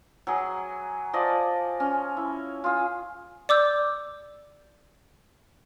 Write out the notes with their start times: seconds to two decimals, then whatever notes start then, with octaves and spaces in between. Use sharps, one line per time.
0.27 F#3 G#4
1.13 F3 D5 D#5
1.80 C#4
2.17 E4
2.64 F4 G#4
3.49 D5 D6 E6 G6